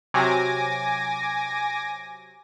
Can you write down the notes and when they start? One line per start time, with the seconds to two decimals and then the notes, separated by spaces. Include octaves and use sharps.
0.14 C3 F#3 G#5 D6 A#6